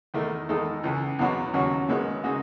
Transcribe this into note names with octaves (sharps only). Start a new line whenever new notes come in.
E2 D#3 A3 D#4
E2 D#3 G#3 D#4 A4
C#2 C#3 E3
E2 B2 F#3 B3
D#2 C#3 F#3 C#4 F#4
F#2 D#3 G#3 B3
C#3 G#3 D#4 F#4